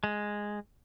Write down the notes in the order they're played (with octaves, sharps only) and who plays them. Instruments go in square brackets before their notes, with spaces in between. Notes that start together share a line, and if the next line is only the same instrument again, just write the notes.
[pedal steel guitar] G#3